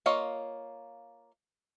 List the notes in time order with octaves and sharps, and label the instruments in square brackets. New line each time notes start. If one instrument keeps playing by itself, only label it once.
[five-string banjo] A#3 F4 C#5 D#5 F5